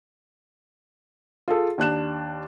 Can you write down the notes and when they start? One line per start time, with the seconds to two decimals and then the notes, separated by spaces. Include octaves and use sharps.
1.48 F4 G#4 A4
1.78 D#2 D4 F#6 E7